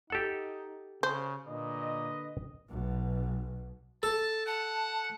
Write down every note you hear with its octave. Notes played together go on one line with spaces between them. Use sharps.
D#4 G4 A4 F#5
C#3 C5
A#2 D3 B4 D#5
B1 B2
A4 A5
F#5 A5